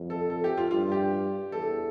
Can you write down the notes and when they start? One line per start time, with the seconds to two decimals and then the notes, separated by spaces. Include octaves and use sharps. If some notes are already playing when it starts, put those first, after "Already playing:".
Already playing: F2
0.10 A4
0.30 A4
0.44 G4
0.58 F4
0.71 G2 F4
0.92 G4
1.52 E2 A4